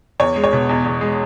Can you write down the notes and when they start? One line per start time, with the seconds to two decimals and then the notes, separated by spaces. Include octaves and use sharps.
0.20 E2 C#5
0.36 G#3
0.44 C#5
0.53 B2
0.69 E2
0.86 E2
1.01 G#3